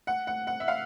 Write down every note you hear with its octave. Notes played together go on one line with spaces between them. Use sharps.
F#5
F#5
F#5
E5
F5